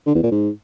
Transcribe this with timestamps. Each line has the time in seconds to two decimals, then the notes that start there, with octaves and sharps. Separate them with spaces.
0.07 D3
0.15 E2
0.23 A#2
0.32 G#2